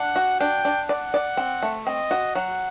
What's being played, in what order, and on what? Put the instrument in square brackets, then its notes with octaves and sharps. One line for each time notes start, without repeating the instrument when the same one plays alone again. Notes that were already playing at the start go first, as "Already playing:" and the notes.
Already playing: [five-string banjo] D4 [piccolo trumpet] F#5
[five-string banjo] F#4
[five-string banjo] D4 [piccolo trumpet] G5
[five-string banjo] D4
[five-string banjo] D5 [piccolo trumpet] F#5
[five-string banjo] D5
C4
A3
[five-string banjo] C4 [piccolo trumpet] D#5
[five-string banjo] F#4
[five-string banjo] F#3 [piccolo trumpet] F#5